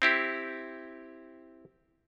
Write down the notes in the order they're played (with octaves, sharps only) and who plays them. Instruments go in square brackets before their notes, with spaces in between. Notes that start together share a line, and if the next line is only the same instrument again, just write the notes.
[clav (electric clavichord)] C4 E4 G4